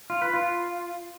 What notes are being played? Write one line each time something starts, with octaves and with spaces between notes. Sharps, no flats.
F4
B4
F4